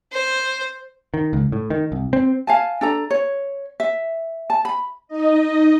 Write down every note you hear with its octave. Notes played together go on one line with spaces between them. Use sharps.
C5
D#3
C#2
A2
D#3
C2
C4
F5 G#5 A5
D4 A4 A#5
C#5
E5
A5
B5
D#4 D#5